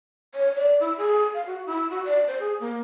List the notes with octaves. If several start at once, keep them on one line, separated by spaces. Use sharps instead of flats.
C#5
D5
E4
G#4
F5
F#4
E4
F#4
D5
C5
G#4
A#3